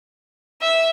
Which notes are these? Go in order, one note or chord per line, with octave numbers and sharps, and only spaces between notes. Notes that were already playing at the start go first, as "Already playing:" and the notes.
E5